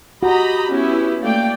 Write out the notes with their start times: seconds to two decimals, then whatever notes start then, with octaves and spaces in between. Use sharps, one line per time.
0.23 F#4 G4 D#5 A#5 B5
0.70 B3 C#4 E4
1.22 A3 A#3 D5 G5